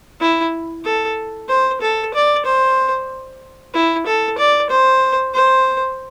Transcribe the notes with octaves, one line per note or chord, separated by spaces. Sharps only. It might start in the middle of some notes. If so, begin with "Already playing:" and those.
E4
A4
C5
A4
D5
C5
E4
A4
D5
C5
C5